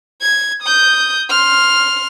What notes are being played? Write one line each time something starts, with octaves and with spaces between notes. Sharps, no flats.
G#6
D#6 G6
C6 F6